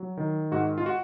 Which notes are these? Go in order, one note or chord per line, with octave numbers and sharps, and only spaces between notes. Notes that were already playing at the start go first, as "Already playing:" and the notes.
Already playing: F#3
D#3
G#2 F#4
F4
F#4